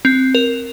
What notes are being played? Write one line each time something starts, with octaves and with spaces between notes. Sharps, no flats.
C4
A#4